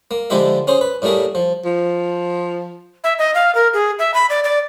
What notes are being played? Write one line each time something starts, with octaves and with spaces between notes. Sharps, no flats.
A#3
D3 F3 G#3 E4 G4 E5
C#4 G#4 C5
B4
A2 G3 A3 A#3 G#4
F3
F3
E5
D#5
F5
A#4
G#4
E5
B5
D5
D5